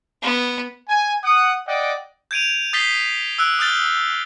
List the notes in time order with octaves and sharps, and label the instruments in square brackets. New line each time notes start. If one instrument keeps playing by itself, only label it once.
[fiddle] B3
[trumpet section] G#5
F#5 D#6
D5 D#5 F#5 G5
[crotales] G6 G#6 D7 D#7 F7
D#6 G6 A6 B6 C7 G7
E6 F#6 D7
D#6 F6 G6 A6 G7